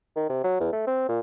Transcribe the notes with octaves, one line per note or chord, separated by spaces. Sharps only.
D#3
C3
F#3
E2
A3
C4
A#2